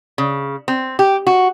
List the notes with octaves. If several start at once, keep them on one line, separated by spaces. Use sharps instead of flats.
C#3
C4
G4
F#4